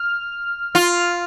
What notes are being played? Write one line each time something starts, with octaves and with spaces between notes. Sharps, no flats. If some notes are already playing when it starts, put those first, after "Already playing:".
Already playing: F6
F4